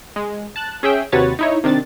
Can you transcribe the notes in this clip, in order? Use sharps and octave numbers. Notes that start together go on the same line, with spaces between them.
G#3
A5 F#6
C#4 G#4 E5 G5
D#2 C3 F#4 B4 C#5 A6
D#4 E4 C#5
C3 D#3 D4 A6